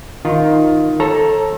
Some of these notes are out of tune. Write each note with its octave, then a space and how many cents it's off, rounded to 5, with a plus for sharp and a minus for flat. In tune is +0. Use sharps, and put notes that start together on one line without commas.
D#3 +5 F4 +0
A4 +0 C#5 -35 A#5 +10